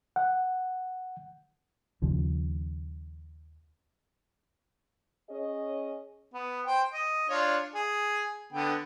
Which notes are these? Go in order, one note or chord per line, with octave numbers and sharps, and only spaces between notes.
F#5
D#2 C#3 F3
C#4 G#4 C#5 D#5
B3
C5 G5
D#5
D4 F4 C#5
G#4
D3 B3 G5